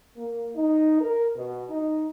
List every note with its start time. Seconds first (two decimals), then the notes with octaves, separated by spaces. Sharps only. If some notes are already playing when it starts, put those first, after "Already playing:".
0.17 A#3
0.55 D#4
1.00 A#4
1.35 B2
1.70 D#4